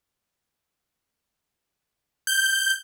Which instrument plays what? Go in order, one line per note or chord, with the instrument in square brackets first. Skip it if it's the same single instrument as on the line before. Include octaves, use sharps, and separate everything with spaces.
[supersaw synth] G6